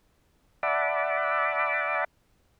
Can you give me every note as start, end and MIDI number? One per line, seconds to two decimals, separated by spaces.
0.63 2.04 74
0.63 2.04 76
0.63 2.04 78
0.63 2.04 81
0.63 2.04 83
0.63 2.04 86